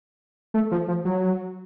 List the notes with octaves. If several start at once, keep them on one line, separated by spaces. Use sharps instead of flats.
A3
F3
F3
F#3